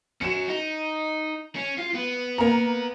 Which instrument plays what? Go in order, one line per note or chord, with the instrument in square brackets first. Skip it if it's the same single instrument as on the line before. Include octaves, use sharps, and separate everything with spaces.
[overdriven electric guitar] C#4 F#4 [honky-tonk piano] C#7 E7
[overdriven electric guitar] D#4
C#4
F4
B3
[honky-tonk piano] A#3 A#5